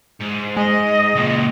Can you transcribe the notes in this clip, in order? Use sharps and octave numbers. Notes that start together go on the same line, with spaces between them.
G#2
G#3 D#5
C#2 A#2